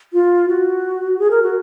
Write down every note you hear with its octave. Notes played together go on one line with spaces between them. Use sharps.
F4
F#4
G#4
A#4
F#4